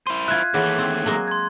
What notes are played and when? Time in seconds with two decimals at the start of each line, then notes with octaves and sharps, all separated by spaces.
0.07 E4 C5 D#7
0.28 F4 E5 F#6 G#6
0.54 D#2 E3 A3 G#4 C#5 F#5
0.78 C4
1.06 F#3 G#3 A#3
1.28 C6 G#6